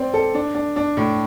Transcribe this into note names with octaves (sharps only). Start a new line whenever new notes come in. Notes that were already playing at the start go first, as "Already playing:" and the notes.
Already playing: C4 D5
A4
D4
D4
D4
A2